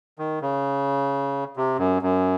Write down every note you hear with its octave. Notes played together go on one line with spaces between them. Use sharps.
D#3
C#3
C3
F#2
F#2